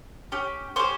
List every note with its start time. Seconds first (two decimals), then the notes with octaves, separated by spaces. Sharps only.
0.32 C#4 G4
0.76 C#4 G4 C5